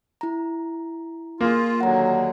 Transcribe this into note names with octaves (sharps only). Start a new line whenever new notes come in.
E4 A#5
A#3 F4 G#4
D#2 D3 F#3 F#5 A#5